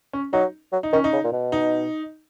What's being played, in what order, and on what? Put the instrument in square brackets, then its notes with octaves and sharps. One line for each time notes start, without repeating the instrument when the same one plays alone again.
[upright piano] C#4
[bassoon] F#3 [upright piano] D#4
[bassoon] F#3
[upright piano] D#4
[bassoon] D#3 [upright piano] C#4
[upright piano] D#4
[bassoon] C#3
A#2
B2
[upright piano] D#4